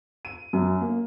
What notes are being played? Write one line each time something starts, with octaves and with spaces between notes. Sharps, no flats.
D#7
F#2
A#3